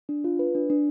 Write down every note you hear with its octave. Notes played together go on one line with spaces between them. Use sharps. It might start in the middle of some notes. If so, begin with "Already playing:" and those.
D4
F4
B4
D4
D4